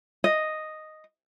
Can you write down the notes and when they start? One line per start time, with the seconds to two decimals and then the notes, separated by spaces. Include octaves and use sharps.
0.24 D#5